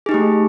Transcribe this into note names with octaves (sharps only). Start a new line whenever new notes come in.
A3 D#4 G4 G#4